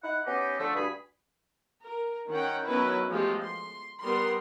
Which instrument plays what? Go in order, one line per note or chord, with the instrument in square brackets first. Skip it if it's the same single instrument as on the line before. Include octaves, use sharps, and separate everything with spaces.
[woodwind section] D#4 E4 F#5
B3 C#4 D#4 G4
D3 F3 A3
D2 G2 G#4 B5
[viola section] A#4
D#3 C#4 F#5 G5
D#3 F#3 B3 C#4 E4 B4
F3 G#3 A3 B3 F4 G4
C6
G3 B3 A#4 C6